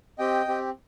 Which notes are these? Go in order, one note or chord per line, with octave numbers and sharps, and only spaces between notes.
C4 G4 D#5 G5
C4 G4